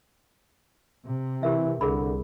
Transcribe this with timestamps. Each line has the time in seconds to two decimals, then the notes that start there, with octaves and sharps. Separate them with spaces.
1.07 C3
1.43 E3 G4 A#4 E5
1.81 C2 D3 G#4 A#4 B5